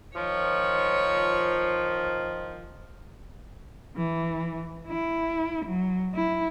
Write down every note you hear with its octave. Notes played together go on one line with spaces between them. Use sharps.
D#3 F3 C#5
E3
E4
F#3
E4